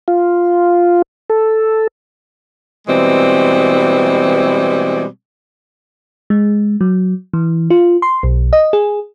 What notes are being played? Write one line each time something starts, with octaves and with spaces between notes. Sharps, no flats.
F4
A4
B2 E3 G3 G#3 C4
G#3
F#3
E3
F4
C6
B1
D#5
G#4